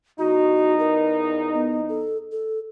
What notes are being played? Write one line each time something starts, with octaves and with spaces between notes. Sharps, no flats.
E2 D#4 F#4
A#4
B3
A4
A4